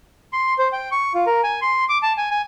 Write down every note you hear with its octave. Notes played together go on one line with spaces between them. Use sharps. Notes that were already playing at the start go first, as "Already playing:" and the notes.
C6
C5
G5
C#6
F4
A#4
G#5
C6
D6
A5
G#5
G#5